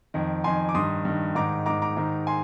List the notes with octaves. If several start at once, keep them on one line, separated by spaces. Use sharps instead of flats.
F2 D#3
F2 D#3 G#5 C6
D6
G2 D#3 C6 D#6
G2 D#3
G#2 D#3 A#5 D6
G#2 D#3 A#5 D6
A#5 D6
G#2 D#3
G#5 C6